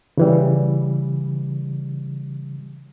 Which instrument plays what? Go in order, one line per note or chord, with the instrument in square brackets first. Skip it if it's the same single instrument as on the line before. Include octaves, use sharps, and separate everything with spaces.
[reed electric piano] C#3 E3 G3